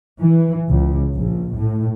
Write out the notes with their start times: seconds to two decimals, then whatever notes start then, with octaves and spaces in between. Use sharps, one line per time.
0.21 E3
0.71 C#2
1.16 A#1
1.57 A2